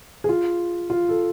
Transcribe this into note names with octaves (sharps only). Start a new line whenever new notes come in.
G#4
F4
F4
A4